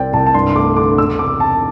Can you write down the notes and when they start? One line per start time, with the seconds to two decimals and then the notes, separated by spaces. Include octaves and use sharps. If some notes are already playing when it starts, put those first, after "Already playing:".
Already playing: C2 C4 D5 G5
0.13 C2 A5
0.26 A5
0.34 G2 C6
0.49 C6
0.56 A3 D6
0.77 D3 D6
0.98 E1 E6
1.19 C3 D6
1.40 C3 A5